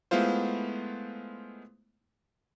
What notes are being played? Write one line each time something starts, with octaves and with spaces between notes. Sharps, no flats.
G#3 A3 B3 E4 F4 C5